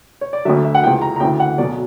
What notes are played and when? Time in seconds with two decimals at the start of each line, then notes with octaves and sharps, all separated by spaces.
0.21 C#5
0.33 D5
0.45 D2 D3 F#3 E5
0.64 E5
0.75 F#5
0.83 C#2 C#3 E3 G5
1.02 A#5
1.16 A#5
1.20 D2 C#3 E3 G5
1.40 F#5
1.58 B1 B2 F#3 D5